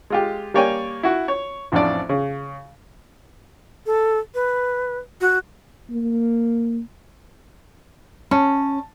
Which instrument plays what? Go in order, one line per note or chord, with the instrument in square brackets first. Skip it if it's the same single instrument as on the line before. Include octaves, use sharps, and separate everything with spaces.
[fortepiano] G#3 F4 G4
G3 A#3 C#5 D5 G5 G#5
E4 F#4
C#5
A1 F2 F3 D4 D5
C#3
[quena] A4
B4
F#4
[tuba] A#3
[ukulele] C#4 [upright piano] A5